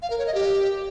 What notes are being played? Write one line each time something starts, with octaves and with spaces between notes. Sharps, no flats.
F5
A#4
C#5
D#5
G4